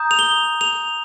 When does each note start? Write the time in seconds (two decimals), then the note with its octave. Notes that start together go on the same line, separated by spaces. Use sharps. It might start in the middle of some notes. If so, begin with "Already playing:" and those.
Already playing: A#5 D#6 G6
0.11 F7
0.19 G7
0.61 F7